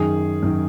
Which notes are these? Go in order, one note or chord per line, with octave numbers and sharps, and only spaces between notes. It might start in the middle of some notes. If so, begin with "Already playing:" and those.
Already playing: F#2 D#3 G#4
F#2 D#3